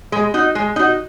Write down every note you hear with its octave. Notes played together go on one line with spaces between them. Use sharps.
G#3
D#4 F#4
G#3
D#4 F#4